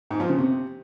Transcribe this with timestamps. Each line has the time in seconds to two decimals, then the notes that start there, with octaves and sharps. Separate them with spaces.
0.11 G#2
0.20 F3
0.29 C#3
0.38 C3